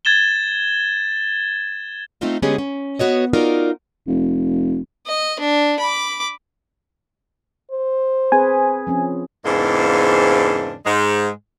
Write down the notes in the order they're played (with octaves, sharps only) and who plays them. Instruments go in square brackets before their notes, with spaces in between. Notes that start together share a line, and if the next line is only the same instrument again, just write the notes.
[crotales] G#6 A6 E7 G7
[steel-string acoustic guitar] A3 C4 D#4 F4 D#5
D3 G#3 B3 C#4 G4 G#4
C#4
B3 F#4 C#5 D#5
D#4 F4 F#4 A#4 D5
[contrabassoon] F1
[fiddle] D#5
D4
B5 D6
[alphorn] C5
[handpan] C4 G#4 B4 [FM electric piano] G#5
[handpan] F3 C4 C#4
[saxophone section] E2 G#2 C#3 A#3 C4 D4
G#2 G#3